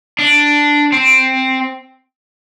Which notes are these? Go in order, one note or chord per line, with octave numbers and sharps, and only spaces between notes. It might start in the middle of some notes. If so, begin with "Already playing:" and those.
D4
C4